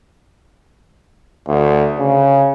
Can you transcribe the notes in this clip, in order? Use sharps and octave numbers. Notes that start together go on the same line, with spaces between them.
D2
C#3